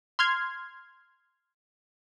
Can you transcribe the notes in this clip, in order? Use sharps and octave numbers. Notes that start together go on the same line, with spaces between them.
C6 F6 G#6